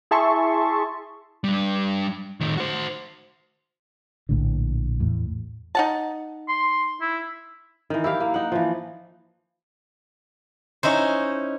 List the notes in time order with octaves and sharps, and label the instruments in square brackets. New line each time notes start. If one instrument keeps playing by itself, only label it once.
[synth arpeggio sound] E4 G#4 E5 A5 C6 C#6
[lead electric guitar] G3 D4
A2 D#3
F#4 C5
[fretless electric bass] A#1 A2 D3
E2 A2
[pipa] D#4 F#5 A5
[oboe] C6
E4
[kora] D#3 E3
E4 G4 F5
A#3
D#4 F#5
E3 F3
[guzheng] C#4 D#4 E4 C5